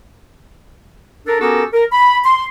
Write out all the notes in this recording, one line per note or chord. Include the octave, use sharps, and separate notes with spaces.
D4 A4 A#4
B3 C#4 F#4 G4 A4 A#4
A#4
B5
C6